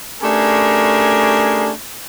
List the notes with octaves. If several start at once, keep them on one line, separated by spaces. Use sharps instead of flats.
A3 C#4 D4 G4 G#4 A#4